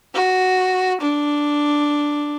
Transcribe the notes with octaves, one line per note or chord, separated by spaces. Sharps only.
F#4
D4